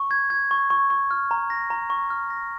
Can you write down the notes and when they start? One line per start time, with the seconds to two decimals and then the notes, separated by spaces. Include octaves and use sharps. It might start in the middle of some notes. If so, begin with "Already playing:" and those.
Already playing: C#6
0.11 G#6
0.30 G#6
0.51 C#6
0.70 C#6
0.90 C#6
1.11 F6
1.31 A#5
1.50 A#6
1.70 A#5
1.90 C#6
2.10 F6
2.30 A#6